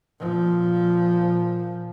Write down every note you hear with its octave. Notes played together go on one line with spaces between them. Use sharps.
A#2 F3